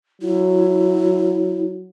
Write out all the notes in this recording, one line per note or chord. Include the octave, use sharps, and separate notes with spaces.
F#3 E4